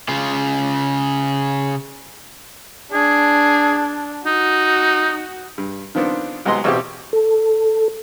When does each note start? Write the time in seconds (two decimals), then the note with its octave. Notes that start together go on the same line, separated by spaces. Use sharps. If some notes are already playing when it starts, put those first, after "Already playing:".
0.09 C#3 F4
2.92 D4 G#4
4.26 D#4 F#4
5.58 G2
5.95 D#3 F3 B3 C4 D4
6.45 C2 F#3 G#3 B3 D#5 C6
6.64 A1 B2 C4 F4 G4
7.13 A4